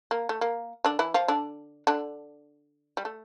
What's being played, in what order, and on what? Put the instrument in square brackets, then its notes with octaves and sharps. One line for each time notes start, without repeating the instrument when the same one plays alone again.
[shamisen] A#3
A3
A#3
D3 D4
E3 E4
F3 F4
D3 D4
D3 D4
G3
A3